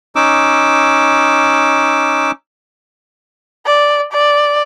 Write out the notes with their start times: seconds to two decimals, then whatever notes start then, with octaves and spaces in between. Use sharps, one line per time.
0.16 C#4 D#4 D6 E6
3.66 D5
4.12 D5